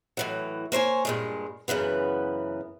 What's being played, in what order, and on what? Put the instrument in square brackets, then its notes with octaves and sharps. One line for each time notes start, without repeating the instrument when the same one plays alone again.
[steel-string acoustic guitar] A2 E3 F#3
A#3 C5 C#5 G#5
G2 A#2 G#3
F#2 C#3 E3 B3